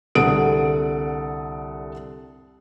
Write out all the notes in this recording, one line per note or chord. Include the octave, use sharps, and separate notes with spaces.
C2 D3 A4 F#5 D#6 D7